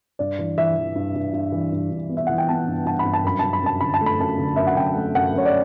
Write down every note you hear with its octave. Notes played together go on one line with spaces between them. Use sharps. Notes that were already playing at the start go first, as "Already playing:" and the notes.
G2 D5
E3
E3 E5
E3
G2
G2
G2
E3
G2
G2
B3
E5
E3 F#5
G5
B3 A5
G2
G2 A5
B5
G2
A5
F#2 B5
F#2 A5
B5
F#2 A5
D3 B5
A5
A3
B5
F#2 A5
D3
F#2 E5
F#5
F#2 G5
A3
F#2 F#5
F#2 C#5
D5